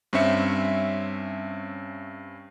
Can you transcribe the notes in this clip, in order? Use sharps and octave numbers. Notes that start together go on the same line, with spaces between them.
G2 C4 C#4 E5 C#7